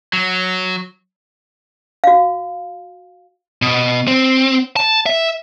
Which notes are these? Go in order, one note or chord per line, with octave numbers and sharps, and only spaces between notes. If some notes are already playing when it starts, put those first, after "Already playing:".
F#3
F#4 F5
B2
C4
A5
E5